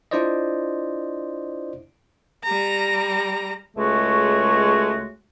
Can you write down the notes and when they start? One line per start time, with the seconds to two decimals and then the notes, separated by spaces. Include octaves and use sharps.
0.11 D4 E4 F4 C5 D5 D#5
2.44 G3 A#5
3.76 C#2 G#3 A3 F#4 C#5